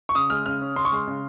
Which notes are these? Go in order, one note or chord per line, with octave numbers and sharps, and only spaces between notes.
C#6
C#3 D#6
G#3 F6
C#3 F6
C#4
C#3 C6
C#6
G#3 C6
C#3